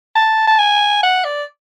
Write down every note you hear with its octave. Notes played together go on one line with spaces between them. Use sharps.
A5
A5
G#5
F#5
D5